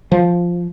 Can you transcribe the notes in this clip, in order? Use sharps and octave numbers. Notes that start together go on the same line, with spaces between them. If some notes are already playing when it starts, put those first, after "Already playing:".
F3